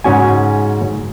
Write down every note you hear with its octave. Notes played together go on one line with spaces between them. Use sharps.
G#2 C#3 C#4 F#4 G#5